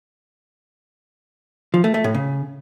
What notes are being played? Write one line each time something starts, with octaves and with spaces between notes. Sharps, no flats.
F3
A3
A3
A2
C#3